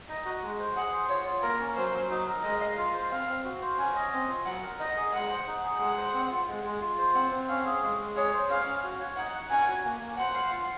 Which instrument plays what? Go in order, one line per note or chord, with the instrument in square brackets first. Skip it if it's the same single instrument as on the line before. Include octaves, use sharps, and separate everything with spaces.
[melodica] D#4 [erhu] D#5
[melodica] F#4
G#3
C5
[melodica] G#4 [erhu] F#5
[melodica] C5
[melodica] F4 [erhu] C#5
[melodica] F4
[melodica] A#3 [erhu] A#4
[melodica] C#4
[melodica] F#3 [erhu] C5
[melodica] F#3
D#4
A#4
[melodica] G#3 [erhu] D#5
[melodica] F5
F4
C5
[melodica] C4 [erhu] F5
[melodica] C4
F#4
C5
[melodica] C#4 [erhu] G#5
[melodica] D#5
C4
F4
[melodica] F#3 [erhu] F#5
[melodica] A#4
[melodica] D#4 [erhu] D#5
[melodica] G#4
[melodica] G#3 [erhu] F#5
[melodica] C5
D#4
G#4
[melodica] G#3 [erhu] F#5
[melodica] C5
C4
F4
G#3
G#3
F4
C5
[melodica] C4 [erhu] F#5
[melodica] C4
[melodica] C#4 [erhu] F5
[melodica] G#4
G#3
G#3
[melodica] G#4 [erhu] C#5
[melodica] C5
[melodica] C#4 [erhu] F5
[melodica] C#4
F#4
C#5
[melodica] D#4 [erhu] F#5
[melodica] F#5
[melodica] C#4 [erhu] G#5
[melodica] F#4
A#3
A#3
[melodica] C5 [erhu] F#5
[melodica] F5
F4